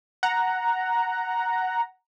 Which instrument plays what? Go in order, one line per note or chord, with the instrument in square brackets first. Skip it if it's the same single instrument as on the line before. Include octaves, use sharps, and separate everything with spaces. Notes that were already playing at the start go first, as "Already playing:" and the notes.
[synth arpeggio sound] F#5 A#5